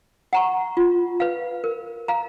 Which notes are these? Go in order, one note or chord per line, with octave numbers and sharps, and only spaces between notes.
F#5 A#5 C#6
F4
B4 F5
A#4
F5 A#5